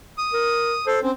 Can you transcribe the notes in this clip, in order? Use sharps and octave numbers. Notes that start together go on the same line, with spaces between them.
D#6
A#4
A4 C5
C4 C#4